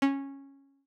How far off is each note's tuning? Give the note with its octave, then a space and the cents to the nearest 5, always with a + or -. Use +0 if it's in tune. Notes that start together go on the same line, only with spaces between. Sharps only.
C#4 -10